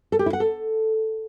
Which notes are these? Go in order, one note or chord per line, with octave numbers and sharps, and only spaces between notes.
A4
G4
E4
F#5
A4